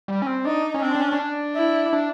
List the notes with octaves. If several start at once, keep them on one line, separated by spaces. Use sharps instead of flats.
G3
C#4
C4
D4 D#4
C#4
C4 D4
C4
C#4
C#4
D4
E4
D4